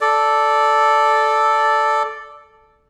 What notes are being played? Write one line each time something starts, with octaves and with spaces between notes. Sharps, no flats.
A4 D5